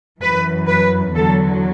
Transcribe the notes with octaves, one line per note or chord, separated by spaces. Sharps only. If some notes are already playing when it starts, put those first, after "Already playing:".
F#2 E3 B4
B4
E2 D3 F#3 A4